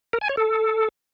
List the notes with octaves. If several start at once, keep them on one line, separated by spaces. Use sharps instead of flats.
A#4
G#5
C#5
A4